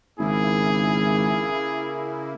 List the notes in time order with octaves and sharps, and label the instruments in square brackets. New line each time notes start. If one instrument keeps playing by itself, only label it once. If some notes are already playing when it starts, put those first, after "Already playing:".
[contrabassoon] G#1 [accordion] C#3 A#3 E4 [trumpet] G#4